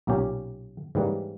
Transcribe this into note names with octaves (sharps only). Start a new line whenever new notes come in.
B1 A#2 A#3 C#4 G4
G#2 E3 G3 A#3 C#4